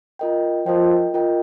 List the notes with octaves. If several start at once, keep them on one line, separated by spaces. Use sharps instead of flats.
F4 A#4 D#5 G5
F3 F4 A#4 D#5 G5
F4 A#4 D#5 G5